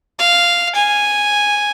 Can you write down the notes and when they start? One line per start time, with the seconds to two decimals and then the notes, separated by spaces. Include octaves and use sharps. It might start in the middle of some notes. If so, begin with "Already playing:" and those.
0.19 F5
0.75 G#5